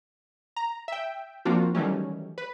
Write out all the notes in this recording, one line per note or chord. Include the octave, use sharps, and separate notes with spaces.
A#5
E5 G5
F3 A#3 C4 D4 F4 F#4
D#3 E3 F#3 G3 A3 C#4
B4